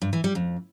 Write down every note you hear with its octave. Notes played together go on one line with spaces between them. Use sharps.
G2
E3
G3
F2